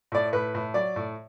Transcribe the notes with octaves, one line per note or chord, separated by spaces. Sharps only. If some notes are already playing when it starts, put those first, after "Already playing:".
A2 D5
A2 B4
A2
F#3 D5
A2